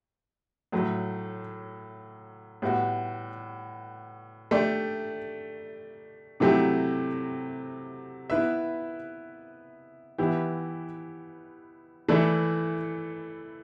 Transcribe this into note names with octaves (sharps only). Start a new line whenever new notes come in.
A2 F#3 A3
A2 G3 B3 F#4
A3 D4 G4 D5
C3 F#3 A3 E4 G4
B3 E4 B4 E5
E3 B3 E4 G4
E3 A3 E4 A4 D5